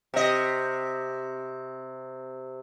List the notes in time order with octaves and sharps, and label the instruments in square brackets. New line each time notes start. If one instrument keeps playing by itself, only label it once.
[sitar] C3 D#5